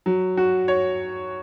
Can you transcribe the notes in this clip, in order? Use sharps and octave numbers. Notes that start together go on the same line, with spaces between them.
F#3
F#4
C#5